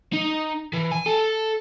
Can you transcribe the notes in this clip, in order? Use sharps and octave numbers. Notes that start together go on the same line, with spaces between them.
D#4
E3
G#5
A4